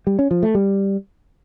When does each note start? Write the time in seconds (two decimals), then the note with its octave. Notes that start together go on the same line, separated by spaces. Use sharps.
0.07 G3
0.19 C#4
0.31 F3
0.43 A3
0.55 G3